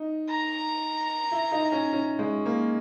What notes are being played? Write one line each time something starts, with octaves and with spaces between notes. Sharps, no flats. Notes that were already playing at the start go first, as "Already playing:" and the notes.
Already playing: D#4
A#5
E4
D#4
C#4
C#4
G#3
A#3